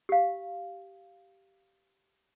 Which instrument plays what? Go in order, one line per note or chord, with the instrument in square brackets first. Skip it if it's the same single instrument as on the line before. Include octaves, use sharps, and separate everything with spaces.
[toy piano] G4 F5